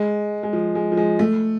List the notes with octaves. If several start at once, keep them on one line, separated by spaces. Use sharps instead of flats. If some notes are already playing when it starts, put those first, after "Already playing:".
Already playing: G#3
G#3
F3
G#3
F3
G#3
A3